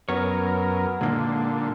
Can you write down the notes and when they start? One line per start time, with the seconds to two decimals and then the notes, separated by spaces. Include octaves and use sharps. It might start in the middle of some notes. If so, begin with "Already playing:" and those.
0.09 F#2 B3 A#4 C#5
1.01 A#2 D3 G#3 A#3 D#4